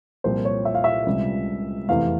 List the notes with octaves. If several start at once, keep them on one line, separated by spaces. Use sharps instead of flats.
C2 A#2 F3 C5
C#5
E5
F5
E5
C#2 C3 G3
F1 E2 C3 F5